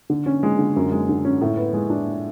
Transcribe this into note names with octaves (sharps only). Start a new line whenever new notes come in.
D3
C#4
G#3
D3
F#2
G#3
D3
C#4
A2
B3
G#3
D4